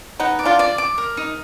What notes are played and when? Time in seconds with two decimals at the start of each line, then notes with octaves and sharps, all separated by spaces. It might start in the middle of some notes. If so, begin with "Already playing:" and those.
0.20 B3 D#4 F#5
0.39 D5
0.45 D4 F4
0.59 D5
0.78 D6
0.98 A#4
1.17 D#4